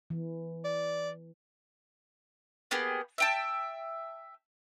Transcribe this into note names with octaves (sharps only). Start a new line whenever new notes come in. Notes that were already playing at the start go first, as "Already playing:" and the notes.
E3
D5
A#3 B3 G4 G#4
E5 G5 A5